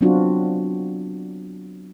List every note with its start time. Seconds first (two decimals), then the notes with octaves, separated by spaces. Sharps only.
0.01 F#3 B3 C4 D4 F4 F#4